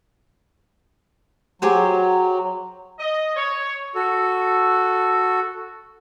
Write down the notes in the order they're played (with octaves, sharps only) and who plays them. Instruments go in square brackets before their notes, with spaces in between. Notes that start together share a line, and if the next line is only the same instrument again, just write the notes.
[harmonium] F#3 [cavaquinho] G4 G#4 C5
[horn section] D#5
C#5
[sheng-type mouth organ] F#4 A4